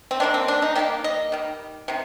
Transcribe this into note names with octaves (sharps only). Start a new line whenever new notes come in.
C4
D#3 G3 A#3 D4
C4
D4
D#4
D#3 G3 A#3 G4
D#5
D#3 G3
C3 D#3